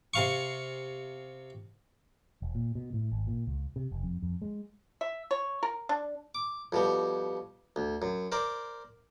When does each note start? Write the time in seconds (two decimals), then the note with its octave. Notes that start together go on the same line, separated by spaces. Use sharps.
0.14 C3 F5 C#6
2.42 E1
2.55 A#2
2.75 B2
2.93 A2
3.11 G#1
3.27 A#2
3.47 C#2
3.76 C3
3.91 F1
4.03 F2
4.22 F2
4.42 G#3
5.01 E5
5.31 C#5
5.63 A#4
5.89 D4
6.35 D6
6.72 F2 B2 G3
7.76 D2
8.02 F#2
8.32 A#4 C5 D5